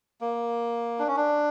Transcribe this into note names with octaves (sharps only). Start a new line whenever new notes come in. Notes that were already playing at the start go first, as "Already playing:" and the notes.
A#3
D4
C#4
D4